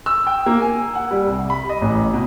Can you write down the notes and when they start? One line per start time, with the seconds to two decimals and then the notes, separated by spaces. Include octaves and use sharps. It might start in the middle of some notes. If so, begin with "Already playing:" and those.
0.06 E6
0.27 G5
0.46 A#3
0.60 G#5
0.95 F#5
1.11 G3
1.27 C2
1.50 B5
1.69 D#5
1.82 A1
2.13 B2